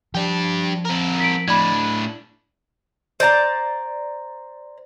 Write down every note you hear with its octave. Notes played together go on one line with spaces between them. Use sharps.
F3 D4 G4
C4 A#4
B6 D7
A2 D4 B5 G#6
C5 D5 A5 A#5